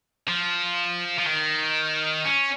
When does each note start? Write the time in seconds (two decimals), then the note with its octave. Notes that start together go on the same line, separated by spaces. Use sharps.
0.28 F3
1.19 F3
1.27 D#3
2.25 C#4